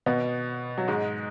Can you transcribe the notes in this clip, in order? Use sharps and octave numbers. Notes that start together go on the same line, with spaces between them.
B2 B3
F#3
G#2 G#3